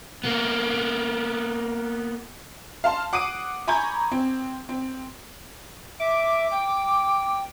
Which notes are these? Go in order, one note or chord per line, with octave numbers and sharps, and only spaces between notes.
A#3 B3
F5 A5 C6
F#5 D6 D#6 C7 D#7
G#5 A#5 B5 C#6 G6 G#6
C4
C4
E5 D6
G5